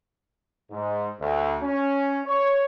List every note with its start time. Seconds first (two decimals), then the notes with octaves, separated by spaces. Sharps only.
0.71 G#2
1.20 D2
1.63 C#4
2.26 C#5